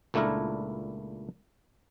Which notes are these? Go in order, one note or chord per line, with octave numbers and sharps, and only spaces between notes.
C#2 A#2 A3 D4 E4 A#4